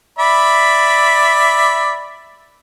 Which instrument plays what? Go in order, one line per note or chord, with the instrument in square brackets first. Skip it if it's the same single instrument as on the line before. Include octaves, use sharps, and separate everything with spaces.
[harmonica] D5 E5 B5